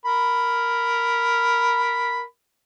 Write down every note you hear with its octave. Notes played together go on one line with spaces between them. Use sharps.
A#4 B5